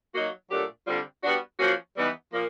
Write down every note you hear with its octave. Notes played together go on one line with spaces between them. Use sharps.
F#3 A#3 D#4 F#4
A#2 F#3 A3 D4 G4
D3 G3 C4 F4
G3 B3 D4 F#4
F3 A#3 C#4 F#4
E3 G3 B3 D#4
A#2 F3 A#3